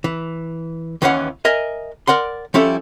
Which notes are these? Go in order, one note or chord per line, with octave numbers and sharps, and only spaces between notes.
E3
D#2 E3 B3 C#4 F5 F#5
A#4 D#5 E5 G#5
A#4 D5 F#5 C6
F3 G3 C#4 E4 A4 E5